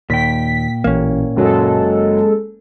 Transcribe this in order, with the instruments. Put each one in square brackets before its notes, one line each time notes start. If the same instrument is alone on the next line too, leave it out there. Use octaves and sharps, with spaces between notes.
[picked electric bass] D#2 [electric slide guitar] A#2 G5 [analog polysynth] B6
[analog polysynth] A1 [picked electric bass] A#3 C#4
[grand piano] F#1 F#3 [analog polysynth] G#3 A4